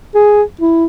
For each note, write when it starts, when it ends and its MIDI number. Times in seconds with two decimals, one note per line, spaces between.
0.15 0.43 68
0.61 0.85 64